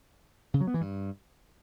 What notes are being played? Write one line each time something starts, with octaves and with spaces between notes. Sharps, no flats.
C#3
F#3
B3
E3
G2